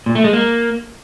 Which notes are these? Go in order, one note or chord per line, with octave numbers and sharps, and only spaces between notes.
A#2
A3
G#3
A#3